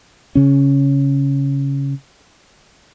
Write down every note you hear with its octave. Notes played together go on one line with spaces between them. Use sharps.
C#3 C#4